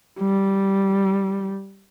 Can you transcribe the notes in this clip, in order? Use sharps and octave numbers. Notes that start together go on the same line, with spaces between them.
G3